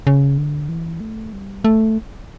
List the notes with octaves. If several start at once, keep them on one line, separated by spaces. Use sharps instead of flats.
C#3
D3
E3
A3
G3
A3